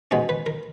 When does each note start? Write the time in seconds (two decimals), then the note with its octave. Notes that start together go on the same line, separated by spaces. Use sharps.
0.11 B2 G#3 C#4
0.29 B4
0.46 A#4